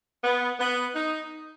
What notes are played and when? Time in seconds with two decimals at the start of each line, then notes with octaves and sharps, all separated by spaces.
0.24 B3
0.60 B3
0.95 D#4